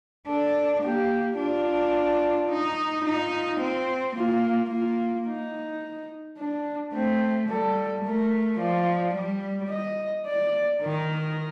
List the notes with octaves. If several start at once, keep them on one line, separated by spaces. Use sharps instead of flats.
D4 A4
A#3 G4
D4 F4
D#4
D#4 F4
C4
A#3 F4
A#3 F4
D#4
D4
A3 C4
G3 A4
A3 A#4
F3 D5
G3
D#5
D5
D#3 A#4